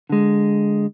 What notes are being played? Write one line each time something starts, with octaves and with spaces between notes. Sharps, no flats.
D3 G#3